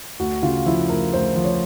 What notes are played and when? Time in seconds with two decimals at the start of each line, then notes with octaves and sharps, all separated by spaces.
0.19 D2 F#4
0.42 C#3 F4
0.66 F3 E4
0.89 D2 A#4
1.13 D2 C5
1.36 F3
1.44 C#5